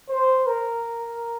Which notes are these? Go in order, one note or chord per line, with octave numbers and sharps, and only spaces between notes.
C5
A#4